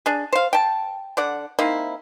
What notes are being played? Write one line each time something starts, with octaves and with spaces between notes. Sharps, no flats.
D4 G#4
C5 F5
G5 A5
D3 D5 F#5
A#3 C4 D#4 E4